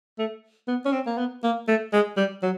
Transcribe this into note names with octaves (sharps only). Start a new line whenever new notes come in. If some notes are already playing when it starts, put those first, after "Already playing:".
A3
B3
C#4
C4
A#3
B3
A#3
A3
G#3
G3
F#3